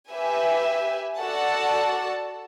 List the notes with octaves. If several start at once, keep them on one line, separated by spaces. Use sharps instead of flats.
G4 B4 E5 G#5
F#4 A4 D5 F#5 A5